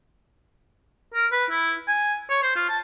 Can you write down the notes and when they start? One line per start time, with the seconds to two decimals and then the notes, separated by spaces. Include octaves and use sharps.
1.14 A#4
1.32 B4
1.50 E4
1.88 G#5
2.30 C#5
2.43 C5
2.56 F4
2.69 A5